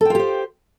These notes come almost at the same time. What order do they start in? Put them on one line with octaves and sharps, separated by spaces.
A4 G5 F4 G4 C5